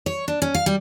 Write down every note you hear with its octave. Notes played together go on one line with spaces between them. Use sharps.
C#5
D4
C#4
F5
G3